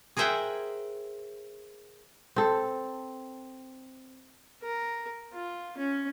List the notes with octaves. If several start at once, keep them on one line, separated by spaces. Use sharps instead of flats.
G#4 A#4 C5 E5 F#5 G5
C4 A4
A#4
F4
C#4